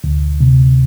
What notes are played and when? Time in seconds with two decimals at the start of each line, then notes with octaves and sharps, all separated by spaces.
0.04 D2
0.41 C3